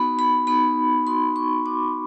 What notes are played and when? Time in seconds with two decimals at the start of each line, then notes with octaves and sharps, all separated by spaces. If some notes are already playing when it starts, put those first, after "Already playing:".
Already playing: B3 D#4 F#4 B5
0.19 B5
0.47 B3 D#4 F#4 B5
1.07 B3 D#4 F#4 C6
1.36 C#6
1.65 B3 D#4 F#4 D6